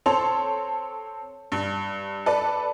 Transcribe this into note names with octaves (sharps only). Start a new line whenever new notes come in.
C4 A4 C#5 A5 C6 F7
G2
A4 B4 D5